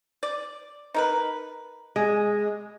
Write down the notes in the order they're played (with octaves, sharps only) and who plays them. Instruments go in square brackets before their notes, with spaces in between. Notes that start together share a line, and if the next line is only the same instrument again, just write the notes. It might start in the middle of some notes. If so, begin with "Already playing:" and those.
[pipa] D5
D#4 A#4 B4
[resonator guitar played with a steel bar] G#3